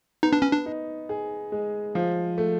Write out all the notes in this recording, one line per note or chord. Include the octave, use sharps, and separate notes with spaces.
B3 D#4
D4
C#4
D4
D#4
G#4
G#3
F3
A3